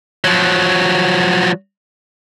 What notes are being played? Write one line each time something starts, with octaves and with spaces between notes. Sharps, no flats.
F3 F#3